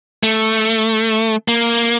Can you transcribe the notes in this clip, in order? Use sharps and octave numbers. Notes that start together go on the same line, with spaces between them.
A3
A#3